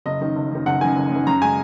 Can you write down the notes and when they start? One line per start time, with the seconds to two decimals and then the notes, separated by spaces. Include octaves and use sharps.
0.06 F#1 D#5
0.21 F#2 D#3
0.36 F#1
0.51 F#2 D#3
0.66 F#1 F#5
0.81 F#2 D#3 G#5
0.96 F#1
1.11 F#2 D#3
1.27 F#2 A#5
1.42 C#3 G#3 G#5